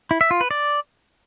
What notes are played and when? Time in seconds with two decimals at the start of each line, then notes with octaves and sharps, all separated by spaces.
0.11 E4
0.21 E5
0.31 F4
0.41 B4
0.51 D5